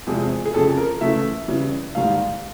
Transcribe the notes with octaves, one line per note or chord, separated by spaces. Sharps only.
E2 C3 F3 G#3 G#4
G#4
F2 C#3 F3 A4
A#4
C#3 E3 A3 E5
C#3 E3 G3
G#2 D#3 G3 A#3 F5